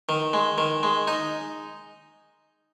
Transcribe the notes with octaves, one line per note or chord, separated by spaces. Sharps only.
D#3
G#3
D#3
G#3
D#4